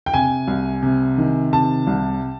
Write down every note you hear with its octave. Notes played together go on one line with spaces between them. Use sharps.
G5
C3 G#5
C2
C3
D#3
C3 A5
C2